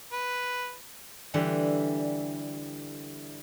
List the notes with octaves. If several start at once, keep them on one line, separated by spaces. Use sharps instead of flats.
B4
D3 E3 G3